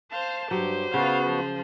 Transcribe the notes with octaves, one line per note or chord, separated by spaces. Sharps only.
C5 F5 A5
G2 F#3 G4 C5
C#3 B3 F4 F#4 F5 F#5
F3